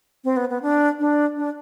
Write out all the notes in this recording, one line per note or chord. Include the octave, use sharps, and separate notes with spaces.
C4
B3
B3
D4
D4
D4